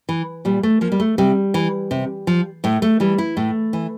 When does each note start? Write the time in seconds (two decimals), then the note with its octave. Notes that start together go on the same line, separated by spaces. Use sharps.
0.09 E3
0.45 A#2 G3
0.63 A3
0.81 F3 A#3
0.92 G3
1.00 A3
1.18 C3 G3
1.54 E3
1.91 C3
2.27 F3
2.64 A2 A3
2.82 A3
3.00 E3 G3
3.18 E4
3.37 A2 A3
3.73 E3